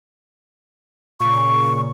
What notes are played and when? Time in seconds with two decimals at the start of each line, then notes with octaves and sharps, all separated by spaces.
1.20 A#2 C#3 C#6